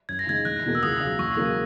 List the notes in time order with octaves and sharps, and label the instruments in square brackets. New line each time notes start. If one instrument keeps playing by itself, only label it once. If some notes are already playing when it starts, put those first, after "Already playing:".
[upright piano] F#2 [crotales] G#6
[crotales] A#6
[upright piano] C#3 G#3 D#4 [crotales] G#6
[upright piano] E1 [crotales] F#6
[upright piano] E2 B2 A#3
[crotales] E6
[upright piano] C#2 [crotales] D#6
[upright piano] C#3 F#3
[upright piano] E1 [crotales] C#6
[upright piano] C#3 F#3 A#3